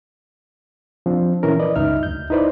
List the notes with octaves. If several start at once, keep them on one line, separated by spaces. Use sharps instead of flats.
F3 C4 D4
A#2 E3 C#4 A#4
B4 D5 D#5
C#2 G2 D#4 E5 F6
D2 G6
D#4 E4 B4 C5 D5